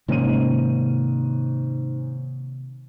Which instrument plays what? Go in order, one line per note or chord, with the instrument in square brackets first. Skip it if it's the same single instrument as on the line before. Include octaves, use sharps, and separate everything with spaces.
[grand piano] G#2 C#4 D#7 [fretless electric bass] C3 D#3 A#3